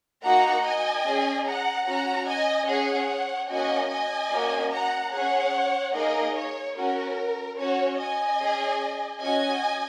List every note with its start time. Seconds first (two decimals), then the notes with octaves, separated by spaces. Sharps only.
0.24 A#3 D#4 F#4 F#5 A#5
0.64 D#5 G#5
1.06 C#4 G#4
1.46 F#5 A#5
1.87 C#4 F#4 F#5 A#5
2.27 D#5 G#5
2.68 C#4 G#4 C#5 F#5
3.50 A#3 C#4 F#4 D#5 G#5
3.91 D#5 G#5
4.32 A#3 C#4 F#4
4.72 F#5 A#5
5.13 C#4 G#4 C#5 F#5
5.95 A#3 D#4 G#4 A#4 D#5
6.36 C#5
6.77 C#4 F#4 A#4
7.59 C#4 F#4 C#5
7.99 D#5 G#5
8.41 C#4 G#4
9.22 C#4 F#4 D#5 G#5